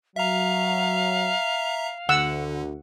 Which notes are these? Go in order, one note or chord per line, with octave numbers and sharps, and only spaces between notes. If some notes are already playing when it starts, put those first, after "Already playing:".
F#3 E5 F5 A#5
D2 D3 F#5 E6